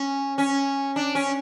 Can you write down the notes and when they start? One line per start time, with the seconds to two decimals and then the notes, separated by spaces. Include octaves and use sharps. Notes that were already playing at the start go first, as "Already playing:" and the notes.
Already playing: C#4
0.38 C#4
0.96 D4
1.15 C#4